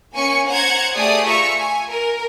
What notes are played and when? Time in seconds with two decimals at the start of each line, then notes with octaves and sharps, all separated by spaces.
0.15 A#3 C#4 G#5 C#6 C#7
0.48 C5 F#5 A#5 G#6 C#7
0.96 A3 G4 G#4 D5 D#6
1.26 F4 E5 A#5 C#6
1.57 G#5
1.90 A#4